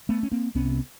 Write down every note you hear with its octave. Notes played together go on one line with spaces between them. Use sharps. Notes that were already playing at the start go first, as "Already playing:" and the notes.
A3 B3
C#4
A#3 C4
C2 C3 B3 C#4